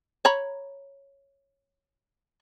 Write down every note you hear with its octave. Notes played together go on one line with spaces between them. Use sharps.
C#5 A#5 B5